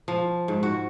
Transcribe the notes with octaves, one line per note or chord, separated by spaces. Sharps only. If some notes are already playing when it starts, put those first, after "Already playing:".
F3
G#2
F#4